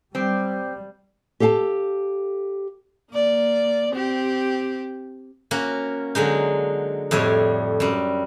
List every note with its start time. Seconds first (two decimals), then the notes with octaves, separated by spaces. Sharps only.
0.15 G3 C4 G4
1.40 G4 A4 F5 F#5 A5
3.12 A#3 D5
3.91 C4 G4
5.51 A#3 C#4 F#4
6.15 D3 F#3 G#3 D#4
7.11 F2 A2 G3 D4 C#5
7.80 F#2 G3